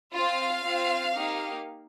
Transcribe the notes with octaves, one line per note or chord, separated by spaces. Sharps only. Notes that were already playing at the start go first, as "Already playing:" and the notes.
C4 F4 F5
C4 F4
A#3 D#4 G4